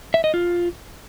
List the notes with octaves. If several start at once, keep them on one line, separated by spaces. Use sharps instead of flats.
E5
D#5
F4